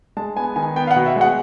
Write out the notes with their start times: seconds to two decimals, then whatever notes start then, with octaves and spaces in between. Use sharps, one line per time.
0.17 G#3 A5
0.37 B3 G#5
0.56 D#3 G#5
0.76 B3 G5
0.87 F5
0.91 F#5
0.96 B2
1.06 E5
1.16 G#3 F#5